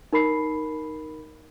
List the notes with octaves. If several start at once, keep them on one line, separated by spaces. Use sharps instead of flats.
D#4 A#4 B5 C7